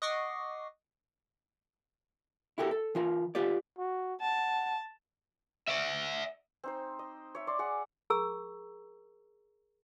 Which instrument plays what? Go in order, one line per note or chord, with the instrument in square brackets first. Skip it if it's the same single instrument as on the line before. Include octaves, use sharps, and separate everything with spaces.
[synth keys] D#5 F#5 C#6 D6 A#6 C7
[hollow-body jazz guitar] E4 F#4 G4 A4 A#4
A4
E3 F4 A#4
F4 G4 B4 D5
[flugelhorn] F#4
[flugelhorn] F#5 [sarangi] A5
[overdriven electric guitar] D5 E5
[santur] C4 D#4 C5
D#5
C#5 E5
D5 C6
G#4 D5 F#5
[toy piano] G#4 A#4 A#5 C#6 E6